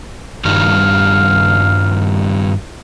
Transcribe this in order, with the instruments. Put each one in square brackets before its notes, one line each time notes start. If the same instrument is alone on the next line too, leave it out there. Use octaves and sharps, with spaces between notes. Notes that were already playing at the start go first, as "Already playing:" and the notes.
[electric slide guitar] G2 D#3 G3 [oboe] F5